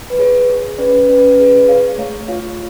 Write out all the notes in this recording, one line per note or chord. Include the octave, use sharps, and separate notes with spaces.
B4
G#4 C#5
G#4 C#5
C#4 B4 D5
C#4 B4 D5
G#4 B4
D5
G#4 C#5 F5
A3 C#5 F5
F4 C#5 F5